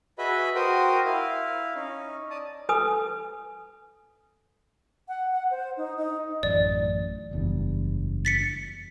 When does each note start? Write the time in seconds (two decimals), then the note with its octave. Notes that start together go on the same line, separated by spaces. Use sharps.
0.18 F#4 G#4 B4 D#5 E5 B5
0.55 F#4 A#4 C5 G5 D#6
1.05 E4 F5
1.75 C#4 D#4
2.30 D5 A5 D#6
2.69 A4 B4 G#5 D#6
5.08 F#5
5.32 F#5
5.51 C5
5.77 D#4
5.97 D#4
6.43 A1 F#2 D5
7.31 F#1 E2 G2
8.25 A6 B6 C#7